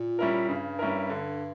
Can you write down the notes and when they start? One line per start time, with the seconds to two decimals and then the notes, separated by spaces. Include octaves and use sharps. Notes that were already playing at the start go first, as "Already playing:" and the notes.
Already playing: A#2
0.19 G3 C#4 E4 A#4
0.49 G2 C#3
0.79 G3 C#4 E4 A#4
1.09 D3